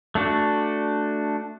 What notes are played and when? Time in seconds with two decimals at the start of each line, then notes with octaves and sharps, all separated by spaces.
0.15 A3 D4 F#4